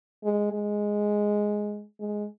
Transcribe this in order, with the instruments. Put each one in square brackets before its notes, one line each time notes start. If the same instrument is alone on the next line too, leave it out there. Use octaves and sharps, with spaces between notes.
[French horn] G#3
G#3
G#3